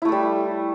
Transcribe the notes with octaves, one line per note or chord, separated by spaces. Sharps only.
G3 A3 E4 A4